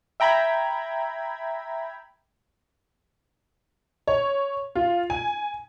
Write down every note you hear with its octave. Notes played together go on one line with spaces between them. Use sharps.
E5 G5 A#5 B5 G#6
C#5
F4
G#5